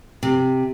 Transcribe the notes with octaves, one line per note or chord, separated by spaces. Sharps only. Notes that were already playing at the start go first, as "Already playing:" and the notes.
C3